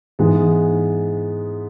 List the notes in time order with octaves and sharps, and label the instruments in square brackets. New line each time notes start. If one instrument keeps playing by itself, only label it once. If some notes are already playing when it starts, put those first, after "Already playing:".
[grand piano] G#2 E3 G#3 B3